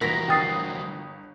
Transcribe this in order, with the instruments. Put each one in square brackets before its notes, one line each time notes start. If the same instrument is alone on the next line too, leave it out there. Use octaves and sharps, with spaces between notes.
[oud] E3 A#4 [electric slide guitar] G3 F4 F#4 [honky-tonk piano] A#6 B6
[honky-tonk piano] G1 D#6 [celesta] G5 A6 C7